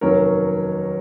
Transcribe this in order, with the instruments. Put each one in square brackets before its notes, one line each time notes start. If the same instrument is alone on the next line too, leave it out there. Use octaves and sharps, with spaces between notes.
[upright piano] F1 D#2 D#3 F#3 C#4 A#4 C#5